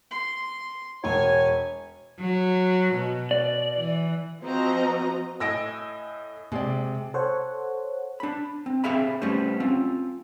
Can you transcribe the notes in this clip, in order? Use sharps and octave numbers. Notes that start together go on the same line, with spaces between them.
C6
E1 C#5 G#5
F#3
B2
D5
E3
F3 C4 F#4 D#5 A#5
A2 D#5 G#5 E6 A#6 D7
C3 G#3 D5
A4 C5 C#5 F#5
D4 B5
C4
C4 G4 G#4 E5 F5 B5
G3 A3 B3 C#4 C5
C4 C#4 F4